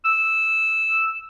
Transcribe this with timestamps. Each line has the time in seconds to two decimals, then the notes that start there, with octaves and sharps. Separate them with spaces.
0.05 E6